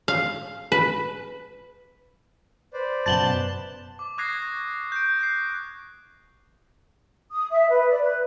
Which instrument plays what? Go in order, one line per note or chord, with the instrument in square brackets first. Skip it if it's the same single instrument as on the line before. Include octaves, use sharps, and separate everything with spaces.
[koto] F5
B4
[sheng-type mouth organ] B4 C5 D5
[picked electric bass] F#1 F#2 B2 [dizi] A5 [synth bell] A6 F#7 G7
[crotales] D6
C#6 D#6 F#6 G#6 A#6 C7
G6 D7
F#6 G6 C7
[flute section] D#6
E5
B4
D5
B4